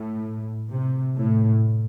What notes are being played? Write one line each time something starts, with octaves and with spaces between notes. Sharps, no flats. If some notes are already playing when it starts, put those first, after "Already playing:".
Already playing: A2
C3
A2